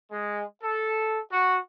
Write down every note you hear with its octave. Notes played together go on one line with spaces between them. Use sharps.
G#3
A4
F#4